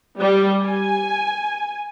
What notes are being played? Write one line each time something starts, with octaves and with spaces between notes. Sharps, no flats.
G3
G#5